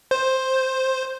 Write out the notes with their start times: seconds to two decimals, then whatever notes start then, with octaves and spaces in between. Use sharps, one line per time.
0.11 C5